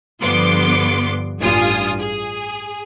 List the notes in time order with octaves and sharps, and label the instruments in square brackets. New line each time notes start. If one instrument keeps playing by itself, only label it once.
[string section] G2 D3 F3 B3 C6 D6
A1 G2 F4 G#5 D#6
G#4